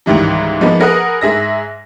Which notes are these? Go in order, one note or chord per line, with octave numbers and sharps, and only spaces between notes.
C#2 G#2 D#3 E3 G3
F3 G#3 A#3 B3 D#4
G#4 A#4 B4 F#5 D#6 F#6
G#2 G#4 E5 A#6